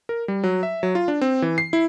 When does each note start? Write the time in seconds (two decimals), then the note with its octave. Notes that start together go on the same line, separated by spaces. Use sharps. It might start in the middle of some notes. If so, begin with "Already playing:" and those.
0.09 A#4
0.28 G3
0.44 F#3
0.63 E5
0.83 F#3
0.95 F4
1.08 D4
1.21 C4
1.42 E3
1.58 C7
1.73 E4